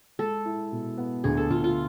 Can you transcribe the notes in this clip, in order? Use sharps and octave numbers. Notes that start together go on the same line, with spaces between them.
G#3 A4
E4
B2
B3
D2 G#4
A4
D2 F4
F4